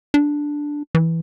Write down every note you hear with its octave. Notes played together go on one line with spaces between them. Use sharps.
D4
E3